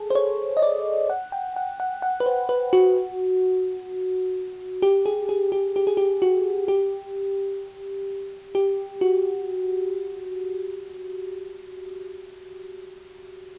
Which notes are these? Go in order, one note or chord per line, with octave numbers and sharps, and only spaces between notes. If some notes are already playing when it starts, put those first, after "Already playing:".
Already playing: G#4 A4
C5
C#5
D#5
D5
F#5
G5
F#5
F#5
F#5
B4
C5
B4
F#4
G4
G#4
G#4
G4
G4
G#4
G4
F#4
G4
G4
F#4